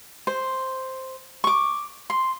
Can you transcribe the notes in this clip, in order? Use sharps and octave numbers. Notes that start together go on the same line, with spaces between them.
C5
C#6 D6
C6